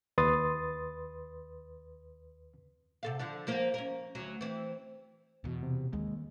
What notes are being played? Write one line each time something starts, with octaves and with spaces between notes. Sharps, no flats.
D#2 B4 C6 D#6 A6
C3 A4 F5
D3 F3 D4
F3 A#3 C5
C#4 A#4
D2 F#3
E3 C4
E2 B2
C3
D#2 G#3